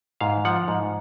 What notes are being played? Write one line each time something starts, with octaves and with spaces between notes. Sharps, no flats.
G#2 F5
F3 F#5
G#2